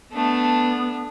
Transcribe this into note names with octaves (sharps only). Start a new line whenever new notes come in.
A3 B3 D4